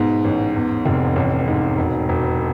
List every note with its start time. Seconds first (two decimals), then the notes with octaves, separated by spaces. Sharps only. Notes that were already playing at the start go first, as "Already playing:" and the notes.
Already playing: G#2 B2 B3
0.24 A1
0.55 E2
0.85 F1
1.16 A1
1.47 G#2
1.77 E1
2.09 E1